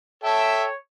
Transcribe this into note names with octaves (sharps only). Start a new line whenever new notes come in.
A4 C#5 E5 G5 A5